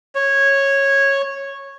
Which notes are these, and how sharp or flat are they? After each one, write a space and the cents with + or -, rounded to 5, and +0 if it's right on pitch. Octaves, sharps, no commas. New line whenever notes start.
C#5 -10